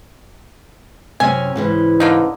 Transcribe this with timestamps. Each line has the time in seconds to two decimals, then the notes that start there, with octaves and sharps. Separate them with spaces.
1.20 F#2 C3 C#4 G#5
1.55 G#2 C#3 E3
2.00 D3 A#3 D#4